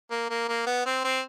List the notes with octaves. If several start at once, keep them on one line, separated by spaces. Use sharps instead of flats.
A#3
A#3
A#3
B3
C4
C4